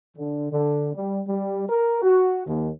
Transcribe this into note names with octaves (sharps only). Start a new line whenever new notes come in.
D3
D3
G3
G3
A#4
F#4
D#2